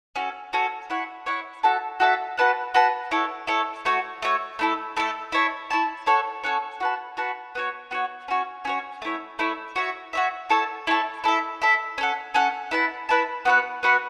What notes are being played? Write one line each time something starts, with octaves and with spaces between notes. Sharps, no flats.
C#4 F#4 A4
C#4 F#4 A4
E4 C#5 F#5
E4 C#5 F#5
F#4 A4 E5 A5
F#4 A4 E5 A5
F#4 B4 F#5 A5
F#4 B4 F#5 A5
E4 A4 C#5
E4 A4 C#5
A3 F#4 C#5
A3 F#4 C#5
A3 E4 A4
A3 E4 A4
E4 C#5 A5
E4 C#5 A5
C#4 A4 C#5 F#5
C#4 A4 C#5 F#5
F#4 B4 A5
F#4 B4 A5
B3 F#4 C#5
B3 F#4 C#5
C#4 F#4 C#5
C#4 F#4 C#5
A3 E4 C#5
A3 E4 C#5
F#4 C#5 E5
F#4 C#5 E5
E4 A4 C#5 A5
E4 A4 C#5 A5
E4 A4 E5
E4 A4 E5
C#4 A4 F#5
C#4 A4 F#5
E4 B4 A5
E4 B4 A5
B3 F#4 B4 F#5
B3 F#4 B4 F#5